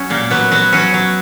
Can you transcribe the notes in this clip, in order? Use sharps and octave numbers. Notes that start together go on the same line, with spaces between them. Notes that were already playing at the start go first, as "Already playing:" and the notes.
Already playing: F#3 C#4
A#2 A#3
F#3 B3
F#3 B3
F#3 C#4
F#3